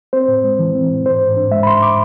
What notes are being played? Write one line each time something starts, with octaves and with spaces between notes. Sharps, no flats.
C4 C5
A2
G#3
E3
C4
A2
G#2 C5
G#2
D4
G#3 E5
B5
G#2 C6
D6